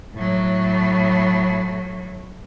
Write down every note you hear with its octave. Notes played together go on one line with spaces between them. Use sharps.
A2 F#3